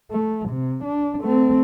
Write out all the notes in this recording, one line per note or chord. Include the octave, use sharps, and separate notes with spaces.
A3
C3
D4
A3 C4